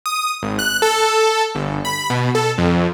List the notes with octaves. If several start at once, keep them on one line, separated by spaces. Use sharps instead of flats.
D#6
G#1
F#6
A4
G1
B5
B2
A4
F2